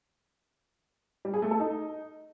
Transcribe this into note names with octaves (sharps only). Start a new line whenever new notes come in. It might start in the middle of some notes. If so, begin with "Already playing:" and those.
G3
G#4
A3
A4
D#4